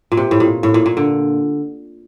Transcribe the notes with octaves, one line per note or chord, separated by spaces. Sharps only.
A#2
C3
A2
A#2
A2
A#2
A#2
D3